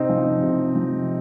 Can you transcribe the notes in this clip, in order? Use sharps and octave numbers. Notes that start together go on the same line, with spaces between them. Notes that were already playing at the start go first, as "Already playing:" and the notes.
Already playing: C3 C4 D#4
F3
C3
F3